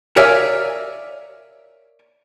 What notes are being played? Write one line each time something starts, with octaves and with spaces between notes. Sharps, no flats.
A#4 C#5 D5 E5 F5 G#5